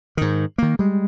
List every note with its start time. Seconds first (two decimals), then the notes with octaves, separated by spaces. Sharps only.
0.17 G#2 D#3
0.58 D#3 A#3
0.79 G3 G#3